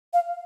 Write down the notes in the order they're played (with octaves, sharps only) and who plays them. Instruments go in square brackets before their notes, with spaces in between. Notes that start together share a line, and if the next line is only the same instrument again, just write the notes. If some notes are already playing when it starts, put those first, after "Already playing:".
[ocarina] F5